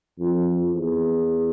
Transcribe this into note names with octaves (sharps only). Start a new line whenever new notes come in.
F2
E2